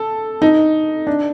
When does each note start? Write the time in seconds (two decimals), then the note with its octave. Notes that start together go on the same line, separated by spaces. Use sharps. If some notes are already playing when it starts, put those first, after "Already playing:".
Already playing: A4
0.42 D#4
1.07 D4